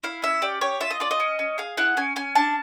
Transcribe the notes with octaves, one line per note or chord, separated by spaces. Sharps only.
E4 F5
C#4 E5
G4 D5
G4 C#5
F4 E5
D#5
F4 D5
D#5
C#4
C#4
G#4 F5
E4 F#5
C#4 G#5
C#4 G#5
D4 A5